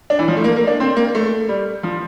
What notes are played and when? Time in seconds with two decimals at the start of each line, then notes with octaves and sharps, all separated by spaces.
0.10 D4
0.19 E3
0.28 F3
0.37 A3
0.44 A#3
0.57 A#3
0.67 D4
0.80 C4
0.96 A#3
1.15 A3
1.49 G3
1.83 F3